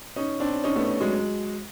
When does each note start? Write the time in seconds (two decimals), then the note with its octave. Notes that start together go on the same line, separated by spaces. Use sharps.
0.16 C#4 D#4
0.40 C4 D4
0.64 C#4 D#4
0.76 A3 B3
1.00 F#3 G#3